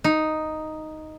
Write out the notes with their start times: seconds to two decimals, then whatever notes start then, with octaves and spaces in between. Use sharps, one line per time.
0.04 D#4